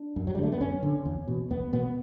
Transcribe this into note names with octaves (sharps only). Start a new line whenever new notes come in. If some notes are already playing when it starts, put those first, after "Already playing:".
Already playing: D4
F#2
F#3
G3
D3 A3
B3
F#2 C#4
D3
E2
B2
E2 B3
B2 B3